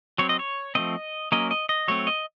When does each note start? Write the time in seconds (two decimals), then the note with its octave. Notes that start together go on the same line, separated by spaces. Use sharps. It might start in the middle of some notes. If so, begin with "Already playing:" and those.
0.18 F#3 C4 C#5
0.29 D#5
0.39 C#5
0.75 F3 A3 C4 D#5
1.32 F#3 A#3 C#4 D#5
1.51 D#5
1.69 D#5
1.88 F#3 A3 C4 C#5
2.07 D#5